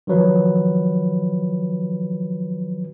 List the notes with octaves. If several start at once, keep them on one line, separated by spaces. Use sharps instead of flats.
D#3 F3 F#3 B4